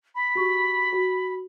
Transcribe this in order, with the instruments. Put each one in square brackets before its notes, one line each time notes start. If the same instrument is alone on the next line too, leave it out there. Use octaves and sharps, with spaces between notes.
[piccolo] B5
[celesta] F#4 G4 C#6
F#4